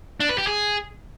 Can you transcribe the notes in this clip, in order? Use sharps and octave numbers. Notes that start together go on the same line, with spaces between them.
D4
B4
G4
G#4